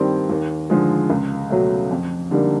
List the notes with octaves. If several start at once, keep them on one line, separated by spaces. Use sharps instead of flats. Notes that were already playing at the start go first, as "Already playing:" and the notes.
Already playing: G2 D#3 G3 C4
D#2
D3 F3 G#3
C#2
B2 F#3 A3
F2
D3 G3 A#3 D#4